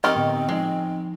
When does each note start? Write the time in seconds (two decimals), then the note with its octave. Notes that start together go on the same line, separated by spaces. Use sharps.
0.04 C4 D#4 G4 A#4 D#5 C#6 F6
0.15 A2 D3 B3
0.49 F3 G#3 D#4